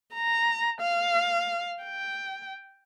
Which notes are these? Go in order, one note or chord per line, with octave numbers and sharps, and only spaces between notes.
A#5
F5
G5